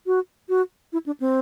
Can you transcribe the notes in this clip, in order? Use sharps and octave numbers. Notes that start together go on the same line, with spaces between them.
F#4
F#4
E4
D4
C4